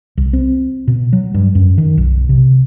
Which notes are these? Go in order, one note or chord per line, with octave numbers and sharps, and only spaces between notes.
C2
C4
B2
F#3
G2
F#2
D#3
B1
C3